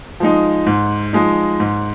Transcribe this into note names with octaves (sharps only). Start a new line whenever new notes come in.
F3 G#3 D#4
G#2
F3 G#3 D#4
G#2